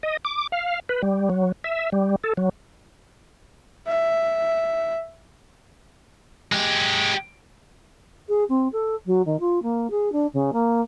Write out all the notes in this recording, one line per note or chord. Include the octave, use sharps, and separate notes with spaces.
D#5
D6
F5
B4
G3
F#3
E5
G3
A4
F#3
E5
G#3 G4
G#4
C4
A4
F#3
D#3
F4
A#3
G#4
D4
C#3
A#3